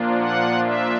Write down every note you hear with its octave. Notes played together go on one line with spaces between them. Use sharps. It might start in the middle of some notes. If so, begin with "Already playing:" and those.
Already playing: A#2 F3 A#3 D4 F4
F#5
E5